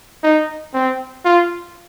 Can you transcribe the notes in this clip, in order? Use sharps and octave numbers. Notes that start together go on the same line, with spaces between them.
D#4
C4
F4